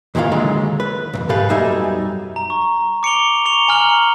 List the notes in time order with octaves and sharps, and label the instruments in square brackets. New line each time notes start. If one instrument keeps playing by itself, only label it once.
[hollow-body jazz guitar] F2 A#2 D#3 E3 F4 F5
D3 D#3 F#3 G#3
B4
B1 F2
G#2 B2 G4 A4 B4 F5
B1 F#2 G3 D#4 E5 G#5
[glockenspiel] A#5
C#6
D6 C#7 D7 F7 G7
A#5 C#6 C#7 F7 G7
G#5 A#5 F6 C#7 F#7 G7